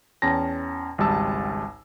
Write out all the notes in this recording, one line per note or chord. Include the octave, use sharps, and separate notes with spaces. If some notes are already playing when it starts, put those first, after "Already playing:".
E2 C#4 G5 A5 A#6
G#1 C#2 G3 A5 E6